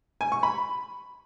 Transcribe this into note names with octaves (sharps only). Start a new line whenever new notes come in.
G#5
C#6
B5